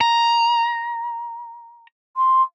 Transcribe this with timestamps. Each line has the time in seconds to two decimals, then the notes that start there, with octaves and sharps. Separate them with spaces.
0.01 A#5
2.16 C6